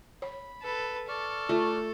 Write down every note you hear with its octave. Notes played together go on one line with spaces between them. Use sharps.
C#5 B5
A4 B4
A4 D5 C#6 F6
A3 F4